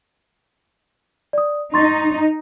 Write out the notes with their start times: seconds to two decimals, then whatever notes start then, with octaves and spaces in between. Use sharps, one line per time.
1.33 D5 D#6
1.74 D#4 C6 C#6 A6